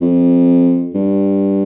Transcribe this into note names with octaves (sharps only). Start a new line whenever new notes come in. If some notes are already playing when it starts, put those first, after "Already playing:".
F2
G2